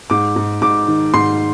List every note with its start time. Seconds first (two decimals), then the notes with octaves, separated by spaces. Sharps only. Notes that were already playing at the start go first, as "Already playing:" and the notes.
0.10 G#2 D6
0.36 G#2
0.62 G#2 D6
0.88 D#3
1.14 G#2 C6